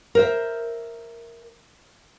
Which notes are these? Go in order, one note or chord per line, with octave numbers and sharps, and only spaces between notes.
A#4 C5 E5